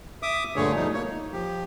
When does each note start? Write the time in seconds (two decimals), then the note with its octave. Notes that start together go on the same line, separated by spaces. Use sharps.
0.23 E5 D6 D#6
0.56 G2 A#2 D3 A3 G#4 C#5
0.76 B2 F3 G3 A3 D#4
0.94 A#3 C#5
1.06 D#4
1.32 F3 G4